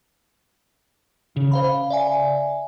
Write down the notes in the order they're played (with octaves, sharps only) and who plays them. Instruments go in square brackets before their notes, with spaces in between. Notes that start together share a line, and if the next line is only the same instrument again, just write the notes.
[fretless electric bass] C#3
[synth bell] C5 F5 B5
F5
D5 E5 G#5